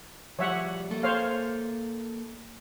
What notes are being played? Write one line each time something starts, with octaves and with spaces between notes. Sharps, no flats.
F3 G3 C#5 E5 F#5
A#3 A4
C5 C#5 F5